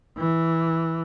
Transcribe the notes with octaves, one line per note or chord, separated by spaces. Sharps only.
E3